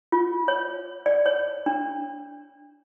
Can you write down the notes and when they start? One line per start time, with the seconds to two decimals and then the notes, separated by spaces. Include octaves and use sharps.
0.12 F4
0.48 C#5
1.06 D5
1.26 C#5
1.66 D4